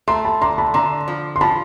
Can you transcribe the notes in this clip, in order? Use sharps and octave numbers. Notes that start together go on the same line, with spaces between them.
A3 A#5 C6
A5 B5
D3 A#5 C6
A5 B5
D3 A#5 C6
F3
C6
F3 A5 B5